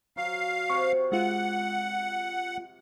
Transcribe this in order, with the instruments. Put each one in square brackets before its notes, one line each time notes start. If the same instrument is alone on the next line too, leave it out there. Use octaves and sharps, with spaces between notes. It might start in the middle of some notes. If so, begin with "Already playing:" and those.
[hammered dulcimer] F#3 [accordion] F5
[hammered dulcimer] C3 [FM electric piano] C#6
[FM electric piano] G#3 F4 [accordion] F#5